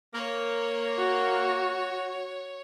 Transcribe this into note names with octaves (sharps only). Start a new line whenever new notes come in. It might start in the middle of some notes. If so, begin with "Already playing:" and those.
A#3 C#5
F#4